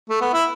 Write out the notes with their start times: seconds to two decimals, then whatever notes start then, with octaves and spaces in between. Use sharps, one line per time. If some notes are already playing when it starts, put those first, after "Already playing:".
0.09 A3
0.21 B3
0.33 E4